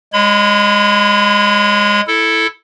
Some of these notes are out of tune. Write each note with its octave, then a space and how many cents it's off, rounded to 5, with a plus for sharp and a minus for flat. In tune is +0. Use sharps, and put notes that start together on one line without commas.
G#3 -15 C#5 -25 B5 +30
E4 +0 A4 +0